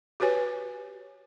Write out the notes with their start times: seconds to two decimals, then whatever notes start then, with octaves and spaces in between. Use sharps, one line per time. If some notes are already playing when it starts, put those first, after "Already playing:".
0.20 F#4 G4 B4 C#5 G#5